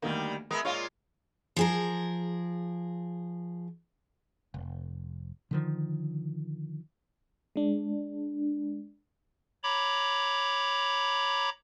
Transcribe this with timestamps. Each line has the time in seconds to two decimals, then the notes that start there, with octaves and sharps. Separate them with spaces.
0.02 D2 D#3 G3 A#3
0.51 G#3 B3 A#4 E5 B5 D#6
0.65 A#2 G#3 F4 C#5 F5 C6
1.56 F3 G#4 A#4
4.54 F1
5.51 D3 D#3 F3
7.56 G#3 D4
9.63 C#5 A#5 B5 D6